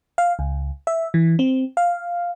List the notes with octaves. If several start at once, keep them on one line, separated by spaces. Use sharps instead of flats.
F5
C#2
E5
E3
C4
F5